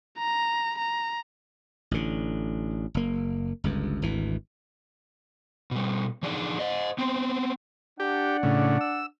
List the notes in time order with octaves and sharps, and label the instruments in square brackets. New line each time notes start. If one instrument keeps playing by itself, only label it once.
[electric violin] A#5
A#5
[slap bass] A1 D3
F#1 A#3
G1 C#2 G2
G#1 D2 E3
[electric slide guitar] B2 G3
E3 F3 D4 D#4 G#4 D5
C5 D#5
B3 C4 C5
[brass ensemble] D4 D5 F#5 [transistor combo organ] G4
[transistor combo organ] A2 C#3
E6